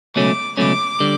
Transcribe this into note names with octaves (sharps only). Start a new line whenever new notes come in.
C#2 B2 F#3 A3 C#4 D6
C#2 B2 F#3 A3 C#4 D6
D3 G3